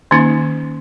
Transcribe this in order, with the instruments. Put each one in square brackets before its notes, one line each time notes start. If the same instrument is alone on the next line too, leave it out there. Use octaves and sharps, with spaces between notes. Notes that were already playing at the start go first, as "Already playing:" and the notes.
[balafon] D#3 A#3 C#4 D#4